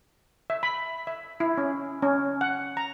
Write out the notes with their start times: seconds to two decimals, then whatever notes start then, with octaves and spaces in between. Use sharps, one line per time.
0.50 E5
0.63 B5
1.07 E5
1.40 E4
1.58 C#4
2.02 C#4
2.41 F#5
2.77 A#5